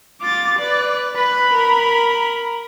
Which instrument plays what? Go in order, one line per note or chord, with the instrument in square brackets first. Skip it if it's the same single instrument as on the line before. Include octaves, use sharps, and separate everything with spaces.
[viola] F4 [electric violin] D6 A6
[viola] B4 [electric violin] D5
[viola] B4 [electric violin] B5
[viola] A#4 A#5